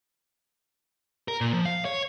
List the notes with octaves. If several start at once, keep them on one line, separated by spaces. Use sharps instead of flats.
A#4
A#2
F3
F5
C#5